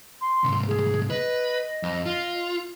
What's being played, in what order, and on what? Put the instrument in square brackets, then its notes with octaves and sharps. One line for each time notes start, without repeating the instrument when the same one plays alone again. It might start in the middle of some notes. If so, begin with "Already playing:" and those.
[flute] C6
[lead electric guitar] C2 G#2
[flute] G#4
[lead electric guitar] B4 [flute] D#5
[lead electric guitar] F2
F4